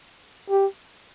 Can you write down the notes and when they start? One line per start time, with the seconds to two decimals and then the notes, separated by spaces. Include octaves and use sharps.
0.50 G4